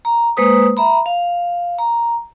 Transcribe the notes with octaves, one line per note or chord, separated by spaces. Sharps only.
A#5
G#3 A#3 B4 C5 D#6
E5 A#5 B5
F5
A#5